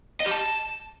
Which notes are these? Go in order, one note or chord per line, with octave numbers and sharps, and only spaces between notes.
D#5
G4
A5